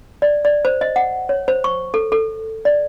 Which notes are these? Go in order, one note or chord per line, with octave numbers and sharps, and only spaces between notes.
D5
D5
C5
D#5
F#5
C#5
C5
C#6
A4
A4
D5